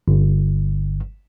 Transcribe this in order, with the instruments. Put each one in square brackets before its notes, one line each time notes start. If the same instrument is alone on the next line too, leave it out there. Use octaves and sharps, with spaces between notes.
[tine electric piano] G1